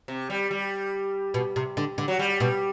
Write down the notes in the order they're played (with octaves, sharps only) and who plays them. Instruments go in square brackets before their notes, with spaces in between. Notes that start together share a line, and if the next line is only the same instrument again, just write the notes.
[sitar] C3
G3
G3
[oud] B2
C3
D3
D3
[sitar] F#3
G3
[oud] B2